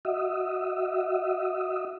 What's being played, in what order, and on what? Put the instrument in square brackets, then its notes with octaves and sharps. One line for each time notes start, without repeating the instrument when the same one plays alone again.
[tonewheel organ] F#4 D#5 E5